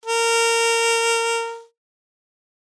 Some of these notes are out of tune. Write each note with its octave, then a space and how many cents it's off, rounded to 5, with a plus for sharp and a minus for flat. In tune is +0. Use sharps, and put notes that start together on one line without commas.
A#4 -20